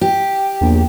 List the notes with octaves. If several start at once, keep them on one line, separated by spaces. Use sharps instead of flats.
G4
A#1 E2